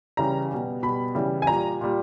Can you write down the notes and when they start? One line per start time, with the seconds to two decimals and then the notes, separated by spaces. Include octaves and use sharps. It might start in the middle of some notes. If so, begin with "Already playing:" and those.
0.17 C#3 E3 G3 A#5
0.50 B2 G3
0.83 B2 G3 B5
1.15 C#3 E3 G3
1.42 G#5
1.47 A#2 G3 A#5
1.81 A#2 G3